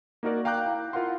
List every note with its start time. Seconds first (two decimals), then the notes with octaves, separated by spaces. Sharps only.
0.23 A#3 D#4 F#4 A#4 D5
0.45 F5 G5 A#5 D6 F#6 G6
0.66 E4
0.93 E4 F4 A#4 F5 F#5 C6